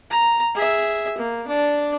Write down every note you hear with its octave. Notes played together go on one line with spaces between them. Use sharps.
A#5
G#4 E5
A#3
D4 D5